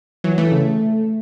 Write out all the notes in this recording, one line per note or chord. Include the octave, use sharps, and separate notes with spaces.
E3 F#3
E3 A3
C#3